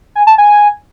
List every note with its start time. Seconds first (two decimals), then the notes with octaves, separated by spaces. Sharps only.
0.15 G#5
0.27 A5
0.38 G#5